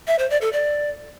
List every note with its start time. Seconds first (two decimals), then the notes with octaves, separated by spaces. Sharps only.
0.07 E5
0.19 C5
0.30 D5
0.41 A4
0.52 D5